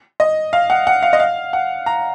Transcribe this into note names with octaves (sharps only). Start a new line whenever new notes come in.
D#5
F5
F#5
F#5
F5
D#5
F5
F#5
A#5